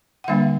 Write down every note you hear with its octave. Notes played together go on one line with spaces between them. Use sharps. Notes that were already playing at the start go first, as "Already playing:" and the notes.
F#5
D3 G3 A#3 D4 F5